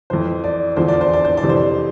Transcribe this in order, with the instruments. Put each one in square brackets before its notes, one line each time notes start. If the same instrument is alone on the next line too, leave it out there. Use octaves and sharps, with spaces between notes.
[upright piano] F2 E3 C5
D5
E2 D3 F3 C5
D5
C5
D5
C5
D5
F2 C3 E3
C5